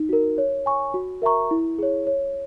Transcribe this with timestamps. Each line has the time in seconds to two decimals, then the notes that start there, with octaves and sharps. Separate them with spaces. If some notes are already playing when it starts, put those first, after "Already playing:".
Already playing: D#4
0.09 F#4 A#4
0.38 C#5
0.66 G#5 C#6
0.94 F#4
1.22 A#4 E5 A#5 C#6
1.51 E4
1.79 G#4 C#5
2.07 C#5